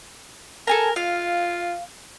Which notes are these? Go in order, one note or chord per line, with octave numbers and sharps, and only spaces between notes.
A4 A#4 G#5 A#5
F4 F5